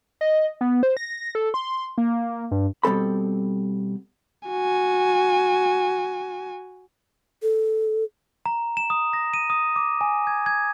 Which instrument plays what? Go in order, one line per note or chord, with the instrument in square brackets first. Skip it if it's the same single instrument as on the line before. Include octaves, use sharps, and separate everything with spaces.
[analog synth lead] D#5
B3
C5
A#6
A4
C6
A#3
G2
[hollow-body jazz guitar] B2 G3 C4 A4 B5
[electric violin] F#4 G#5
[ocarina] A4
[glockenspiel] A#5
E7
D#6
A#6
D#7
D#6
D6
G#5
G#6
G#6